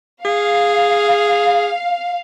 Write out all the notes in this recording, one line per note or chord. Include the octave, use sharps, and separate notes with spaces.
G#4 F5